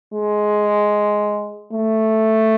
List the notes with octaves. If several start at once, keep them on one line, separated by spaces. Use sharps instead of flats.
G#3
A3